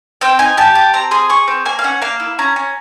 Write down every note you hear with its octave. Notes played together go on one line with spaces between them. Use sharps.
C4 G5
D#4 G#5
G4 A5
G4
C4 A#5
G#4 C6
G#4 C#6
C4
A#3 G#5
F5
C#4 F#5
A#3 F5
E4
C#4 A#5
C#4